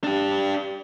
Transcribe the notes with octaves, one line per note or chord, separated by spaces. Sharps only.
D4 G4